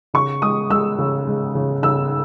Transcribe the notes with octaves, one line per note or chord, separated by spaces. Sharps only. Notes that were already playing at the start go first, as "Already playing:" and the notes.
C#3 C#6
G#3 D#6
G#3 E6
C#3
G#3
C#3
C#3 E6